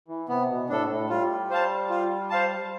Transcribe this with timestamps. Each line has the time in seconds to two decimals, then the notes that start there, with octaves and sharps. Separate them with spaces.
0.08 E3
0.29 C3 B3
0.49 B2
0.69 A2 D4 A4
0.89 A2
1.09 G3 F4
1.50 C5 F5 A5
1.89 F4
2.30 C5 F5 A5